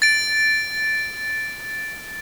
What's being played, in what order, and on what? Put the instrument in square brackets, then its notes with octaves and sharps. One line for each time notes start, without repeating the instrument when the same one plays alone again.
[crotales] A6 D7